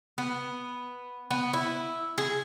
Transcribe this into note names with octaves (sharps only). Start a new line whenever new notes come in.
B3
B3
E4
G#4